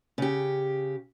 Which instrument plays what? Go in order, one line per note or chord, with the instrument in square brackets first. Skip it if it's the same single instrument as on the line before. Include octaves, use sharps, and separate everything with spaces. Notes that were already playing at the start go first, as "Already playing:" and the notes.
[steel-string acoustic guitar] C#3 G4